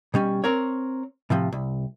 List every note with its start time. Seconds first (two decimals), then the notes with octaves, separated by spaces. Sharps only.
0.14 B2 G3 C#4
0.44 C4 A#4 C#5
1.30 A2 C3 F3
1.52 C2